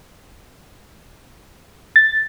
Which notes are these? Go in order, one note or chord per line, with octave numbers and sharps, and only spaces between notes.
A6